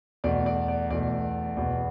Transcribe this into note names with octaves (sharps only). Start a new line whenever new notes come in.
E2 B2 A3 D5
D5
D5
E2 B2 A3 D5
E2 B2 B3